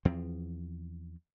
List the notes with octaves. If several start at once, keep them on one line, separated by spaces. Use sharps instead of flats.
E2 F3 C4